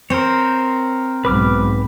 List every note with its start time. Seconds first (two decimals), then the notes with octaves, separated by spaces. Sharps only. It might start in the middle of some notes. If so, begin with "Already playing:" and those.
0.10 C4 A#4 C5 C#5
1.25 B1 G#2 B4 D6 F6